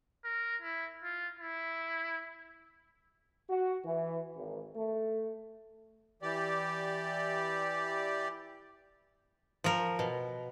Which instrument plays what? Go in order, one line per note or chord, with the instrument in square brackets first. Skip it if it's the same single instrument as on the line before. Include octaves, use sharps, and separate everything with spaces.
[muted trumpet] A#4
E4
F4
E4
[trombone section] F#4
E3
G#1
A3
[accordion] E3 G4 D5
[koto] F3 A#4
B2